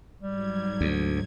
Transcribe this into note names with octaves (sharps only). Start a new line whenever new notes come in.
G#2 F#3 G3 G#6
D2